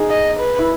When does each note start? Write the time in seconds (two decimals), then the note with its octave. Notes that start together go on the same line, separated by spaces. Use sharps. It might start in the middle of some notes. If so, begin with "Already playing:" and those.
Already playing: D#4 G#4
0.09 D#5
0.39 B4
0.59 E4